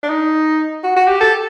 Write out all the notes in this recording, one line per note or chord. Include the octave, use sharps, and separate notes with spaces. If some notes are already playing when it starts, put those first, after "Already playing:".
D4
D#4
F#4
F#4
G4
A4